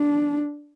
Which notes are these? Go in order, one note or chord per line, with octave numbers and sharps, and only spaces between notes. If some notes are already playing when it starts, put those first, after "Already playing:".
Already playing: D4